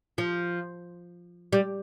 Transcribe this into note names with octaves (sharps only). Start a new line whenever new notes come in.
F3
G3